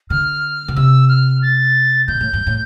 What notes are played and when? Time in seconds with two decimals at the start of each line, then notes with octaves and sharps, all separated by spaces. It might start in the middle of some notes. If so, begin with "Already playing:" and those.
0.10 D3 F6
0.68 B2
0.76 C3 E6
1.09 F6
1.43 A6
2.08 B2 G6
2.21 A2
2.33 G2
2.47 A2